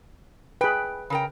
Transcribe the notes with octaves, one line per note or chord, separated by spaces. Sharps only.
G#4 B4 G5
C#3 A#4 G5